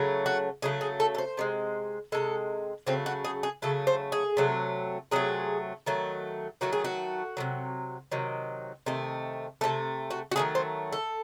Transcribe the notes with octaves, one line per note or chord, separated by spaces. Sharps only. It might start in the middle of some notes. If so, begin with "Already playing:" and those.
Already playing: C#3 F#3 A3
F#4
C#3 F#3 A3 G#4
G#4
A4
A4
C5
C3 D#3 G#3
C3 D#3 G#3 A4
C#3 F#3 A3 C4
F#4
G#4
G#4
C#3 F#3 A3 A4
C5
G#4
C3 F#3 A3
C3 F#3 A3 G#4
D#3 F#3 A3
D#3 F#3 A3 F#4
G#4
F#4
C3 D#3 F#3
C3 D#3 F#3
C3 D#3 A3
C3 D#3 A3 A4
F#4
F#4
D#3 F#3 A3 G#4
C5
A4